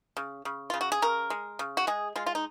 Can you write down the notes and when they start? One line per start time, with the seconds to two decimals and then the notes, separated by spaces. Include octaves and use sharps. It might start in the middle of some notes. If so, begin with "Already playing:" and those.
0.17 C#3
0.45 C#3
0.70 C#3 F4
0.81 F#4
0.92 G#4
1.02 C#3 A#4
1.30 G#3
1.59 C#3
1.77 F#4
1.87 G#3 G#4
2.16 G#3 F4
2.26 F4
2.35 D#4